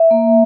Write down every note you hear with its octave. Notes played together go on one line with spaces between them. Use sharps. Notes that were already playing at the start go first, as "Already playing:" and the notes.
Already playing: E5
A#3